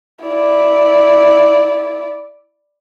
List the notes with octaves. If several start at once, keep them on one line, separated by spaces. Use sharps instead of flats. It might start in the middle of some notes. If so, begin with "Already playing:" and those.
E4 D5